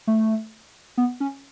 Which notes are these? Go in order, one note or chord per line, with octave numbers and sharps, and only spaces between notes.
A3
B3
C#4